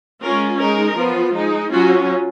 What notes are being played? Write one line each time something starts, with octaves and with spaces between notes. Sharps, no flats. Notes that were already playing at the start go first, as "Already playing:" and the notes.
G#3 C#4 F4 A#4
G#3 D#4 A#4
F3 B3 F4
G#3 D#4
F#3 C#4 F4 F#4